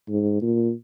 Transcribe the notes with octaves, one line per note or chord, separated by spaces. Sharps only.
G#2
A#2